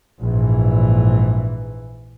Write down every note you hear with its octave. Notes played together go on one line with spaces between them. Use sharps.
A#1 G#2 E3